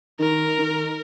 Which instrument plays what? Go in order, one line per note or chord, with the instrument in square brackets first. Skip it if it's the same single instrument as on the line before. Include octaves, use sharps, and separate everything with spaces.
[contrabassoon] D#3 [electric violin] A#4
[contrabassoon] D#3